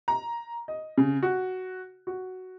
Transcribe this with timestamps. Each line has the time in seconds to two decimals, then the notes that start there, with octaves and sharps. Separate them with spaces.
0.08 A#5
0.68 D#5
0.98 C#3
1.23 F#4
2.07 F#4